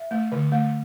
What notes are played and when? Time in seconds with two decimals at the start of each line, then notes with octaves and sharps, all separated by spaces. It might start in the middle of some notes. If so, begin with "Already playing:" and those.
Already playing: E5
0.11 A3
0.32 D3
0.52 A3